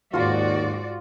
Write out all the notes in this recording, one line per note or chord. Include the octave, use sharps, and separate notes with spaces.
D#2 G#2 F4 F#4 D5 C6